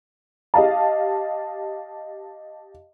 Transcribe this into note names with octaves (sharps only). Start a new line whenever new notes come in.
G4 D#5 F5 A5